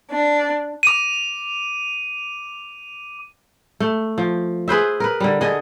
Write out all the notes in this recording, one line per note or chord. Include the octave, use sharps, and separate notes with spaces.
D4
D6 D#7
A3
F3
G#4 B4 C5 E5
A#4 B4
D3 G3
D3 G#4 D#5